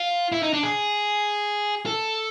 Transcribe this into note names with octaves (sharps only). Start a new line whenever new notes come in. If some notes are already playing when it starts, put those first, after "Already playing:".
Already playing: F4
E4
D#4
D4
G#4
A4